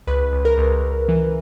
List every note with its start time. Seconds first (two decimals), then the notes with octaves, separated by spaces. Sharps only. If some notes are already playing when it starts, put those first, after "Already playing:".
0.07 C#2 B4
0.33 C#2
0.45 A#4
0.58 C#2
0.83 C#2
1.08 E3